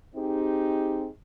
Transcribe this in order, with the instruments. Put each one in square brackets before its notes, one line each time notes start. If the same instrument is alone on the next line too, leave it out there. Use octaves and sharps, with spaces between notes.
[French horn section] C4 D#4 G4 G#4